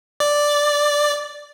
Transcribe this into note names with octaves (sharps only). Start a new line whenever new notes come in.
D5